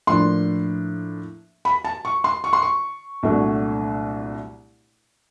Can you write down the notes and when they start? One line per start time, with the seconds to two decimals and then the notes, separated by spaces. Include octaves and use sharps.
0.07 A2 F3 A#3 D4 C6
1.65 B5
1.84 A5
2.05 C#6
2.24 C6
2.44 C#6
2.53 C6
2.62 C#6
3.23 C2 A#2 F#3 A3 D4